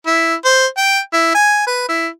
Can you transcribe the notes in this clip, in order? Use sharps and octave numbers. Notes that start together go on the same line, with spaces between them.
E4
C5
G5
E4
G#5
B4
E4